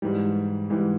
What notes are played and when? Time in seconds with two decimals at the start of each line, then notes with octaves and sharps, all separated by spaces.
0.02 G#2 E3 G3
0.70 G#2 E3 G3